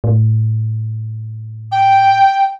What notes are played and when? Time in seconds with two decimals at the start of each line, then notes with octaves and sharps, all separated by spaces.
0.04 A2
1.72 G5